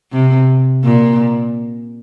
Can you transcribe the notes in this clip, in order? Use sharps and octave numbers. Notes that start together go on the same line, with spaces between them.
C3
A#2